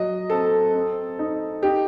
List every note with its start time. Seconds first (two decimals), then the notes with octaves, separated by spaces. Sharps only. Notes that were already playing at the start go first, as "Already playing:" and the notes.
Already playing: F#3 D#5
0.30 C4 A4
0.74 C4
1.19 D#4
1.63 D#4 G4